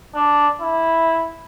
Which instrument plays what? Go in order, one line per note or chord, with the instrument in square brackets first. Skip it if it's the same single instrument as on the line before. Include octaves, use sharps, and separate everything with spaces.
[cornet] D4
E4